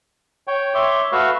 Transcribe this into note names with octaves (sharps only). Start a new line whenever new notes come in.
C#5 G5
C#5 E5 C6 D6
A3 F#4 B4 F5 C#6 E6